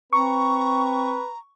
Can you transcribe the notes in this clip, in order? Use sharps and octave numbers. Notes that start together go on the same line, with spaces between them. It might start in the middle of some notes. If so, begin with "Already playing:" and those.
C4 B4 A#5 C#6